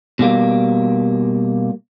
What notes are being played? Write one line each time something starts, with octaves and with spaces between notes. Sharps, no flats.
B2 G3 A#3